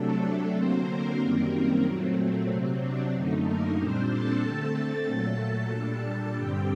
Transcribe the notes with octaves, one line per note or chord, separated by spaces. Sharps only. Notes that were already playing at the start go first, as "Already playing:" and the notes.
Already playing: C3 F#3 A3 D4 A4
A3 A4
D3 F#3 A#3 C4 C5
A#3 A#4
F#2 D#3 G3 A#3 C4 A#4
A#2 F#3 A3 C4
C3 F#3 C4
D4
F#2 D3 A3 D#4
A#3 A#4
A#2 G3 C4 D4 C5
A4 A5
D3 A3 C4
A#2 F#3 A3 A4 A5
A4 A5
A#2 G3 D4 A4 A5
A4 A5
G2 D3 G3 C4 G4 G5